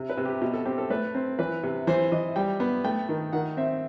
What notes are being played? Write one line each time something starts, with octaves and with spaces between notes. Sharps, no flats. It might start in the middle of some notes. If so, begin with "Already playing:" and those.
Already playing: C3
B4
C3
G4
B2 G4
A4
C4 G4
A4
A3 B4
C4
E3 B4
C3
E3 C5
E3 D#5
G3 G5
B3
A3 G5
D#3
D#3 F#5
C4 E5